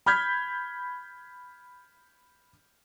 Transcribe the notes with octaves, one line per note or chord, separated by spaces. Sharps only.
B5 F6 G6 G#6 B6